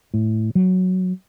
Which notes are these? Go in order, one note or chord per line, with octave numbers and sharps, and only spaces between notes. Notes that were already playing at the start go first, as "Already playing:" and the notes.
A2
F#3